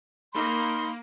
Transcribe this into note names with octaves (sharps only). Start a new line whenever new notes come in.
A#3 D#4 B5 C6